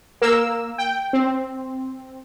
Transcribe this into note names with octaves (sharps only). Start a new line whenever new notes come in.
A#3 A#4 E6
G5
C4